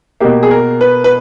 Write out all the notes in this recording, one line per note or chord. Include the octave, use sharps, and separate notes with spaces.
B2 A#3 G4
G#4
A#4
B4
B4